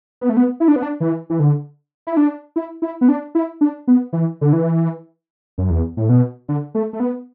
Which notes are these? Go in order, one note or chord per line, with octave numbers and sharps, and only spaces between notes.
B3
A3
B3
E4
D4
B3
D4
E3
E3
D3
E4
D4
E4
E4
B3
D4
E4
D4
B3
E3
D3
E3
F#2
E2
A2
B2
D3
A3
A3
B3